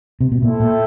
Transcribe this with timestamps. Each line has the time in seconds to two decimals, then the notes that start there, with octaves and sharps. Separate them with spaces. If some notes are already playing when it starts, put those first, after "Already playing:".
0.21 C3
0.32 B2
0.42 A#2 E4 A4 C5 E5 G5
0.60 A#2